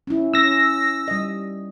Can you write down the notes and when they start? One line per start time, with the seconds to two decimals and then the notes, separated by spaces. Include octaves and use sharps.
0.07 C#4 E4
0.34 C#4 E6 A#6
1.08 G3 D#5